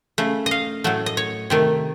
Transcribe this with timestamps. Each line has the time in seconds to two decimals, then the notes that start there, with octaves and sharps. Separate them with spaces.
0.18 C#3 A3
0.46 D#5
0.51 F5
0.84 A2 F#3 A3
1.06 D#5
1.17 C#5
1.50 C3 D#3 A3